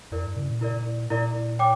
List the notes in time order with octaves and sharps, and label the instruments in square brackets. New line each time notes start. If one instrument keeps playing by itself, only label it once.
[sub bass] F2 [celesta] E4 A#4 D5
[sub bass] G2
C#3
A#2
[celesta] E4 A#4 D5
[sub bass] A#2 [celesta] E4 A#4 D5
[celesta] C#5 G5 D6